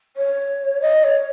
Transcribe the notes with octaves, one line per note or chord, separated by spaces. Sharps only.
C#5
D#5
C#5